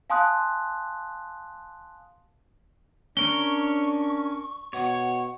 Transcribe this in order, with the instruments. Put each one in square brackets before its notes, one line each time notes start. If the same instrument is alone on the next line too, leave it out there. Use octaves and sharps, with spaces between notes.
[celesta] F5 G#5 A5 C6 D#6 F#6
[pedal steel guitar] C#4 A#4 C#5 [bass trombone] D4 [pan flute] C#6 [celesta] G7
[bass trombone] B2 [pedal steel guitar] C#5 [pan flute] F#5